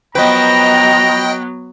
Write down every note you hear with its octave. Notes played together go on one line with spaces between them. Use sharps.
F3 F#3 B3 B4 D#5 G5 A#5